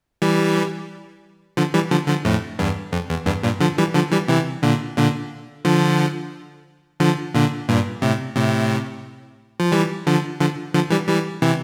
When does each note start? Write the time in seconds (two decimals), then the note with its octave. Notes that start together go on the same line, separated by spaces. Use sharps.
0.22 E3 G3
1.57 D3 F3
1.74 E3 G3
1.91 D3 F3
2.08 D3 F3
2.25 F2 A2
2.59 E2 G2
2.92 F2
3.10 E2
3.26 E2 G2
3.43 G2 A#2
3.60 D3 F3
3.78 E3 G3
3.94 D3 F3
4.12 E3 G3
4.28 C3 E3
4.62 A#2 D3
4.97 A#2 D3
5.65 D3 F3
7.00 D3 F3
7.35 A#2 D3
7.69 G2 A#2
8.02 A2 C3
8.36 A2 C3
9.60 F3
9.72 E3 G3
10.07 D3 F3
10.40 D3 F3
10.74 D3 F3
10.90 E3 G3
11.08 E3 G3
11.42 C3 E3